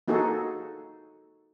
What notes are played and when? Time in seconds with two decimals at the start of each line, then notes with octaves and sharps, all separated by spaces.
0.08 A#3 D#4 F#4 G#4 A4